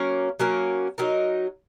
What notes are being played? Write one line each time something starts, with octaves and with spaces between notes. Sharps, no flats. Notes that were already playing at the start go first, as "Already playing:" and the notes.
Already playing: F#3 A#3 C#4 A#4
F#3 A#3 C#4 A#4
F#3 D#4 A#4